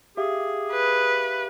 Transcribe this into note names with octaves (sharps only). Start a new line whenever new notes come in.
G4 G#4 E5 F5
B4